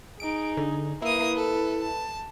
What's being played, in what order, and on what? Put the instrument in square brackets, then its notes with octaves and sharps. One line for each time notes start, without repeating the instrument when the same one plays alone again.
[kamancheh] D#4 G#4 [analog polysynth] D7
[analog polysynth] D3
[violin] A#3 D#6 [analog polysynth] E4 [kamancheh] B4
[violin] A4
A5